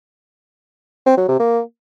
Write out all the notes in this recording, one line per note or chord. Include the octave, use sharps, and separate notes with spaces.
C4
F#3
C3
A#3